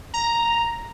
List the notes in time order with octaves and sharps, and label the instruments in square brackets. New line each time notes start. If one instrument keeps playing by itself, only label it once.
[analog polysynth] A#5